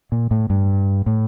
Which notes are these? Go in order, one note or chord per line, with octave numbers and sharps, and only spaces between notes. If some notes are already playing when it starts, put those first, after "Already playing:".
A#2
A2
G2
A2